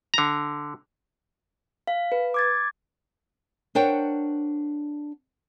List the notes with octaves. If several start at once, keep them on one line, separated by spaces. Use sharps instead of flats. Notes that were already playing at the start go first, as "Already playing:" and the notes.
D3 A#5
F5
B4
D6 G#6 A6
D4 A#4 C5 C#5 F#5 G5